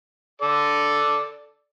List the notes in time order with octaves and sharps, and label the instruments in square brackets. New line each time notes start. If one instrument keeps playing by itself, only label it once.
[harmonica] A4 D5